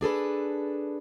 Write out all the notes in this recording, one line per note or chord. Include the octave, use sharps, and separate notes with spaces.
D4 G#4 A4 B4